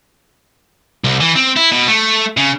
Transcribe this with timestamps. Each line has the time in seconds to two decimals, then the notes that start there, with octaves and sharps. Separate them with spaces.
1.04 C2
1.20 E3
1.35 C4
1.56 E4
1.72 B2
1.87 A3
2.37 C#3